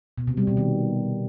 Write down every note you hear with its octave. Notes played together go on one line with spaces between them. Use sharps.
B2
C3
G3
B2
D#3